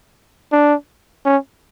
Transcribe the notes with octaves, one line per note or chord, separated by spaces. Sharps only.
D4
C#4